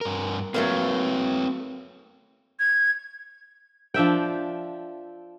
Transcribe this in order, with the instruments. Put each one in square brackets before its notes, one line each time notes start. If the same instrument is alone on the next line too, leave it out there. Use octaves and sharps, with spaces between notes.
[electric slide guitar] G2 A#4
[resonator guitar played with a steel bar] F#3 A3 A#3 [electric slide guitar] C4 B4 C#5
[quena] G#6
[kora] F3 D4 E5 G5